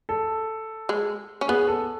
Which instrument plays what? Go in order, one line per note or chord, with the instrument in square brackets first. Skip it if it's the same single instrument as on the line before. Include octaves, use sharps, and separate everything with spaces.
[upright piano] A4
[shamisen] G#3
C#4
[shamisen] B3 [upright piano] G#4
[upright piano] A4